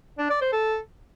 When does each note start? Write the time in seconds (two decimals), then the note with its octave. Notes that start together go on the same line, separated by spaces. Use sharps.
0.18 D4
0.30 D5
0.41 C5
0.52 A4